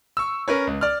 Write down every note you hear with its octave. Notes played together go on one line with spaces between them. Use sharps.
C#6 E6
C#4 A#4 B4 C#5
C#2
D5 F6